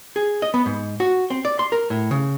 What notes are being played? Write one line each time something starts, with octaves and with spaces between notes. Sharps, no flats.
G#4
D#5
B3
G#2
F#4
C4
D5
C6
A#4
A2
C#3